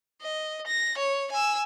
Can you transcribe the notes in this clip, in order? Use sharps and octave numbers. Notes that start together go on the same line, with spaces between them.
D#5
A#6
C#5
G#5 E6